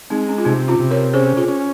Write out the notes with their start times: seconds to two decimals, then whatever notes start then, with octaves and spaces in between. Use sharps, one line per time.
0.10 G#3 C4 D#4
0.29 C#4
0.38 F4
0.45 C3 C4 D#4
0.68 C#4 F4
0.79 C3
0.91 A#4 C#5
1.13 C#4 G#4 C5
1.37 F4 G#4
1.48 C#4